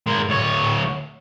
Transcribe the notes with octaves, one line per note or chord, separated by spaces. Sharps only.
G#3 A#4
D2 C#5